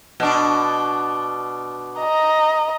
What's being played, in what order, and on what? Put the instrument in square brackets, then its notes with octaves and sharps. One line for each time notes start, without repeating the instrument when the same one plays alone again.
[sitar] B2 D4
[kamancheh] D#5 A#5